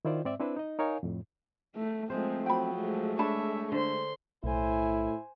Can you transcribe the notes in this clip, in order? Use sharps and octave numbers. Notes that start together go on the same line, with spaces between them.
D#3 E4 F4 C5 D5
G#2 C4 D5 E5
C4 D4 E4 B4 C5
D#4 D#5
D#4 A#4 C#5 F5 G#5
F2 A2
A3
F3 G#3 A3 C4 C5
F3 F#3 G5 B5
G#3 A3
D4 C#5 E5 A5 B5
D3 C5 C6
B1 A2 E4 C5 G#5